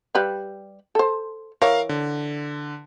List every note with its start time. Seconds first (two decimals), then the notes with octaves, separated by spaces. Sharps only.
0.15 G3 B4 F5
0.95 A4 C5
1.62 E3 A#4 C#5 F5
1.89 D3